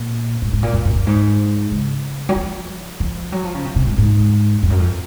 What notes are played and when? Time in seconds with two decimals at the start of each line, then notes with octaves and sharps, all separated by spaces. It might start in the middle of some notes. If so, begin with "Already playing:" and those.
Already playing: A#2
0.42 G#2
0.53 G#2
0.63 A#2
0.73 F#2
0.85 F#2
0.95 F#2
1.07 G#2
1.71 C#3
2.29 F#3
2.36 F3
3.00 F3
3.32 F#3
3.44 F3
3.55 C#3
3.65 C3
3.76 C3
3.87 G#2
3.98 G#2
4.63 F2
4.70 F#2
4.78 F2